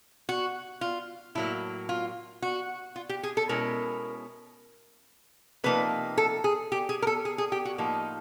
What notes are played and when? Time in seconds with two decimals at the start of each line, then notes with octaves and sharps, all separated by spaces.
0.29 F#4
0.81 F4
1.35 A2 F#3 A#3 E4
1.89 F4
2.42 F#4
2.96 F4
3.09 G4
3.23 G#4
3.37 A4
3.49 B2 G#3 C#4 E4 A#4
5.64 C3 F3 A#3 D#4 B4
6.17 A4
6.44 G#4
6.72 G4
6.89 G#4
7.02 A#4
7.07 A4
7.25 G#4
7.38 G#4
7.52 G4
7.65 F#4
7.78 A2 F3 A#3 D#4